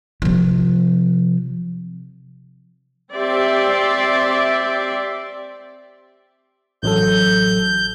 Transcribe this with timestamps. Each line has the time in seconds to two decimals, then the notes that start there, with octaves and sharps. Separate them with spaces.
0.22 C3 F3
3.12 C4 G4 D5 E5 C6
6.83 A1 F#3 A4 G6